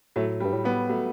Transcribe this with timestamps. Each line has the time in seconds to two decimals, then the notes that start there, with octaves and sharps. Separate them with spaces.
0.16 A2 F#3 A3
0.40 G3
0.45 G2
0.53 A2
0.64 G3 B3
0.89 F#3 A3